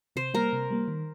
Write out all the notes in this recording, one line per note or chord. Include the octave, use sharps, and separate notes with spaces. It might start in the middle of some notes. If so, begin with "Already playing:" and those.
C3 C5
G3 A#3 A#4
C3
G3 A#3
D#3